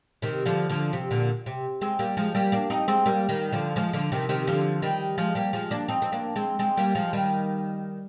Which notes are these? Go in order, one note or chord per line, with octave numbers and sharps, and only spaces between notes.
C3 D#3
D3 F3
D3 F3
C3
A#2 D3
C3
G#3 C4
G3 A#3
F3 G#3
G3 A#3
A#3 D4
C4 D#4
G#3 C4
G3 A#3
D#3 G3
D3 F3
F3 G#3
D3 F3
C3 D#3
C3 D#3
D3 F3
D#3 G3
F3 G#3
G3 A#3
F3 G#3
A#3 D4
C4 D#4
C4
A#3 D4
G#3 C4
G#3 C4
G3 A#3
F3 G#3
D#3 G3